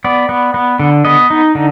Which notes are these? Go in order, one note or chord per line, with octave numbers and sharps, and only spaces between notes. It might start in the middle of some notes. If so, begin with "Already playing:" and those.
B3 D5
B3
B3
D3
B3 D#5
D#4
D3